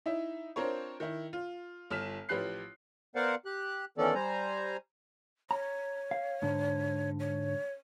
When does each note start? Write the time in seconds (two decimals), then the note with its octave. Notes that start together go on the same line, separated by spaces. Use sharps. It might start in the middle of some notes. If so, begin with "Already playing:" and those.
0.06 D#4 E4 E5
0.56 C4 D4 F4 A#4 C5 C#5
1.00 D#3 E4
1.33 F4
1.90 G1 F6 B6 E7
2.29 A1 F3 G4 B4 F#6 C7
3.15 B3 A#4 C5 D5 F5 F#5
3.45 G4 F#6
3.98 D#3 E3 B3 C#4 A4 D5
4.15 G3 C5 G#5 A#5
5.51 C#5 A#5
6.11 F5
6.42 G#2 D3
7.20 C#5